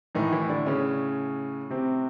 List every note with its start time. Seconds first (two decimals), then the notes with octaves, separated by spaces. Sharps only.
0.15 A2 D#3 E3 D#4
0.32 E3 E4
0.49 D3 D4
0.66 C#3 C#4
1.70 C3 C4